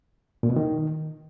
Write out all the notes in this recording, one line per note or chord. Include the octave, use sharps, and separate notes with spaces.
A#2
B2
D#3